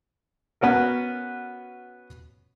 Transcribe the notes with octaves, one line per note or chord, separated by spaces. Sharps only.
B3 C#4 F#4 A#4